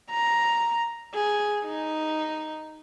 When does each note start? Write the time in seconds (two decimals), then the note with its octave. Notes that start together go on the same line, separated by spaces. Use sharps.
0.11 A#5
1.14 G#4
1.65 D#4